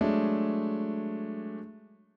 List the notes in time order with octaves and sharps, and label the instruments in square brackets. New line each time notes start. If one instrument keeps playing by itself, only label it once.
[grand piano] F#3 G#3 A3 D4